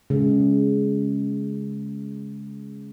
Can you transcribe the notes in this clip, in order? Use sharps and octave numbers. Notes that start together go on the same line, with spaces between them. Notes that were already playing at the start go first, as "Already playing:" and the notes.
C#3 G#3